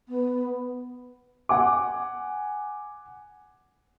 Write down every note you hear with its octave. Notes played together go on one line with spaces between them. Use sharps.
B3
F#5 G#5 D6